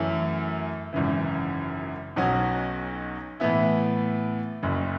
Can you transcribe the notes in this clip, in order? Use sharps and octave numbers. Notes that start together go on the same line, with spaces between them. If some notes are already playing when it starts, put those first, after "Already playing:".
Already playing: F#2 E3 A3 C#4 E4
G#1 F#2 C#3 E3
B1 B2 F#3 C#4 F#4
A2 E3 B3 E4
F#1 F#2 C#3